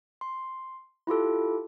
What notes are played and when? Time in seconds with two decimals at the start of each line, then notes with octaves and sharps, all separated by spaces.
0.21 C6
1.07 E4 F4 G4 A4